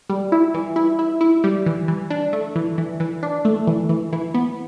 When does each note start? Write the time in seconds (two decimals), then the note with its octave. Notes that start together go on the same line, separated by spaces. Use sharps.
0.09 G3
0.32 E4
0.54 E3
0.76 E4
0.99 E4
1.21 E4
1.44 G3
1.66 E3
1.88 E3
2.10 D4
2.33 A3
2.56 E3
2.78 E3
3.00 E3
3.23 D4
3.45 A3
3.67 E3
3.89 E3
4.13 E3
4.34 B3